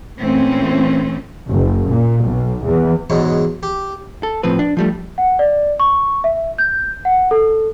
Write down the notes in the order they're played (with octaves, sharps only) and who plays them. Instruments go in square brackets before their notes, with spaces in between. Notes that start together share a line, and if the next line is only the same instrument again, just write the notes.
[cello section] A#2 E3 A3 C4 C#4
[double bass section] F#1
A#2
B1
E2
[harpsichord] E2 G#2 B2 F#3
G4
[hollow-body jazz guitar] A4
A2 F3 C4 B4
D4
F3 G3 A3
[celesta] F#5
D5
C#6
E5
G6
F#5
A4